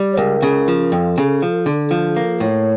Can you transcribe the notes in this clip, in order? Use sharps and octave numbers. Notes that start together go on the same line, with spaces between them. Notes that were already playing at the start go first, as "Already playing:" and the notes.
Already playing: G3
C#5
C#2 A#4
C#3
F3
F2 A4
C#3
F3
D3
F3
A#3
A2 C#5